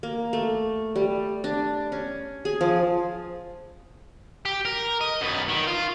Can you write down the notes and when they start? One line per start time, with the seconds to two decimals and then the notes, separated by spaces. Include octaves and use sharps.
0.03 A#3
0.33 A3
0.96 G3
1.44 D4
1.92 C#4
2.45 G#4
2.61 F3
4.45 G4
4.65 A#4
5.01 D#5
5.21 F#2 B3
5.49 D#3
5.67 F4